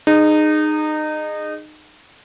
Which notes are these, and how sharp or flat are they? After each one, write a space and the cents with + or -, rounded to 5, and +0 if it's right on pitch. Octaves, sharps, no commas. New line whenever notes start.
D#4 -25 G#4 +0